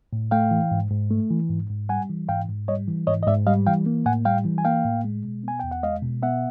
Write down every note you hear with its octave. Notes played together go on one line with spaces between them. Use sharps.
A2
A3 F5 G5
E3
G#2
G#2
A3
E3
G#2
G#2
G3 F#5 G#5
E3
G#2 F5 G5
G#2
G3 C#5 D#5
E3
G#2 C#5 D#5
D#5
G#2 D5 E5
G3 D#5 F5
E3 F5 G5
A#3
A2 F#5 G#5
G3 F5 G5
E3
G#5
A#3 F5 G5
A2
G#3
B2
B3 G#5
E2 G5
F#5
G#3 D#5 F5
B2
B3 E5 F#5